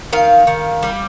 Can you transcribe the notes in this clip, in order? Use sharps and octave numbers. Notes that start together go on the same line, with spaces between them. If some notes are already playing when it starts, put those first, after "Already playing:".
D#3 F5
D#3
G3